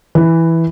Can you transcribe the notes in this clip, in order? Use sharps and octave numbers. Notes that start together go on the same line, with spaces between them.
E3